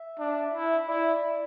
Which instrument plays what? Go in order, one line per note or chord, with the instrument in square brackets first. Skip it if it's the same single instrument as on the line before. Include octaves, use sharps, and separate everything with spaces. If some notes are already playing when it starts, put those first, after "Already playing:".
Already playing: [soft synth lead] E5
[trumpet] D4
E4
[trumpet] E4 [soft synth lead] D5